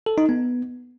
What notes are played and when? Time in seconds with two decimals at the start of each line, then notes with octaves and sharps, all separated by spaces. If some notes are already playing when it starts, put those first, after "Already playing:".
0.06 A4
0.18 D#4
0.29 B3